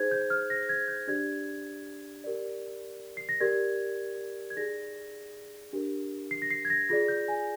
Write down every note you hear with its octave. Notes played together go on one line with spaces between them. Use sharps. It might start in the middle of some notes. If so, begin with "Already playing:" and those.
Already playing: D#4 G#4 C5 G#6
G6
F6
A#6
G#6
G6
D4 G4 D5 G#6
G4 A#4 D5
C7
A#6
G4 A#4 D5 G#6
G#6
D#4 G#4 D5 A#6
D4 G4 A#4
C7
A#6
C7
G#6
A#6
F4 G#4 D5 A#6
G6
G#5